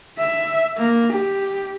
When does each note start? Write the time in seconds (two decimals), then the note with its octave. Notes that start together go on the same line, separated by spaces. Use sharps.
0.19 E5
0.77 A#3
1.13 G4